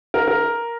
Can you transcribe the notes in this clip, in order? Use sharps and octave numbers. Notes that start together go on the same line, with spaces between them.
A#4
A#4